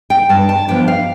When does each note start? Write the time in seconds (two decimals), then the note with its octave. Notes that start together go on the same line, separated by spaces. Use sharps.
0.10 G5
0.29 G2 A5
0.49 A5
0.68 F3 B3 D4 G5
0.88 F5